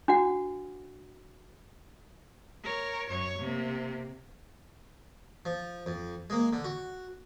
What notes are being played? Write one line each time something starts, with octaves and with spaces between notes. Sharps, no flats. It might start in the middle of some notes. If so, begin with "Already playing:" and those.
D4 F#4 F#5
A#4 C#5
F#2 C#5
C3 A#3
F3
F2
G#3 A#3
D3
F#4